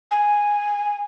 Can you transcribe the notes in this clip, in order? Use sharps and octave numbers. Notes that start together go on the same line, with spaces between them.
G#5